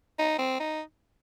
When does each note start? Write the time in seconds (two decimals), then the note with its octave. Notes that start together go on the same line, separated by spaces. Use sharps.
0.19 D#4
0.38 C4
0.60 D#4